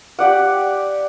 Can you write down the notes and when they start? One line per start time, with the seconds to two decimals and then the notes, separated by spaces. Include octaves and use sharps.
0.19 G4 D5 F#5